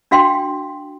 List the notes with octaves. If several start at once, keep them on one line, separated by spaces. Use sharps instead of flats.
D4 F#4 F5 G5 C6